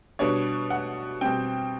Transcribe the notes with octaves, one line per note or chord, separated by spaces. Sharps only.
B2 G3 B3 D4 C#5
F#5
B2 G3 C4 G5